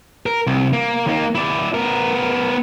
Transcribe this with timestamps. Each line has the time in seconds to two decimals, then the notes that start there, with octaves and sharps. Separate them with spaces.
0.26 A#4
0.47 C2
0.73 A#3
1.06 D#2 A#3
1.35 E4 D5
1.74 B3 A#4